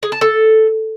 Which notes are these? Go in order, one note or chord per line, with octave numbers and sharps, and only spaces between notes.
G#4
A5
A4